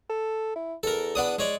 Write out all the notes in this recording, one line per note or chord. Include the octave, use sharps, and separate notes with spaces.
A4
E4
E2 A4 A#4
B3 D4 D#6
G#3 C#5 D5